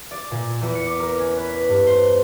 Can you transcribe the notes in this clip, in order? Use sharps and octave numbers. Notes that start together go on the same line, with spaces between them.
D5
A#2
E2
C#7
D6
A#4
C#4
B4
G2
C5